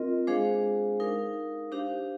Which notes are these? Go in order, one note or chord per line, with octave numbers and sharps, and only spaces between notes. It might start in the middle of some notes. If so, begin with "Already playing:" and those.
Already playing: C4 F4 A#4 D#5
G#3 D4 G#4 C5 F5
D#4 A#4 F5
D4 G4 C5 F5